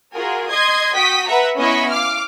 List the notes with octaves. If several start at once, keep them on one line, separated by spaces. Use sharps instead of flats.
F4 F#4 G#4 A#4
D#5 C6 D#6 G#6
F#4 G5 D#6 B6
B4 E5 F#5 A#5
B3 C#4 E4 D#5 B5 C#6
F5 D6 F6